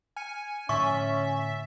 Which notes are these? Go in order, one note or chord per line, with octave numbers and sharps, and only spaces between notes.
G#5 F6 C#7
A2 D3 C#4 E5 C#6 A6